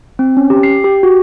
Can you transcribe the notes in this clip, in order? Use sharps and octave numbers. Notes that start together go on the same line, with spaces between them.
C4
C#4
G4
C7
G4
F#4